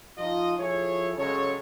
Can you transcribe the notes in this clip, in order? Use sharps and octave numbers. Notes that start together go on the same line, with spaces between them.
F3 D#4 F4 D#5
F3 E4 G#4 A4 C#5
C#3 F#3 G#3 A4 C#5